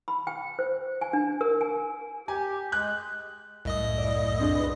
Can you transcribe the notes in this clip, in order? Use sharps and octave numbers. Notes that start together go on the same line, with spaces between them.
B5
G5
C5
G#5
D4
A#4
G#5
G4 G#5
G#3 F#6
C2 F#2 A2 D#5 E5 D#6
D5
C4 D4 G#4
B4